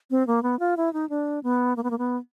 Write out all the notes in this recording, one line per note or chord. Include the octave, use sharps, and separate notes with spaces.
C4
A#3
B3
F4
E4
D#4
D4
B3
A#3
B3
A#3
B3